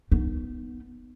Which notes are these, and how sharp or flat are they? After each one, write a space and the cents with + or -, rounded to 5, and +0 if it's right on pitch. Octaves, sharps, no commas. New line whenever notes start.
B3 +0 D#4 -15